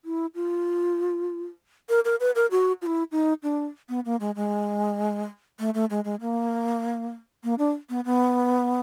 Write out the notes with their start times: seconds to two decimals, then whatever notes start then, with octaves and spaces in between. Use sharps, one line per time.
0.05 E4
0.35 F4
1.89 A#4
2.05 A#4
2.20 B4
2.35 A#4
2.51 F#4
2.82 F4
2.86 E4
3.12 D#4
3.43 D4
3.89 B3
4.05 A#3
4.20 G#3
4.36 G#3
5.59 A3
5.74 A3
5.90 G#3
6.04 G#3
6.21 A#3
7.44 A#3
7.58 D4
7.90 B3
8.05 B3